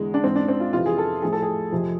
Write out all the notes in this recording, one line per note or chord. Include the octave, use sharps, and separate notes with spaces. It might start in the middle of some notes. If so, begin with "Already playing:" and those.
Already playing: E2 D3 G#3
D4
G#2 E3 C4
D4
C4
F4
F2 C3 E3 F4
G#4
A4
A2 F3 G#4
A4
G#4
F2 C3 F3